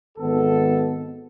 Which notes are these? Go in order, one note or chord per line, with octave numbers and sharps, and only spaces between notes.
G#1 D#3 B3 A4